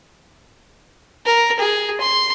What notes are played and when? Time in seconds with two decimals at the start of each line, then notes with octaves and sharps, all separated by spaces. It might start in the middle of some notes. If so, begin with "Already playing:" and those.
1.25 A#4
1.59 G#4
2.01 C6